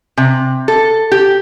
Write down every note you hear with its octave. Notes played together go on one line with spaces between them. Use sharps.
C3
A4
G4